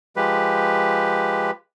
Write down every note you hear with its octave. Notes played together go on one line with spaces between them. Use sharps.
F3 G#3 G4 B4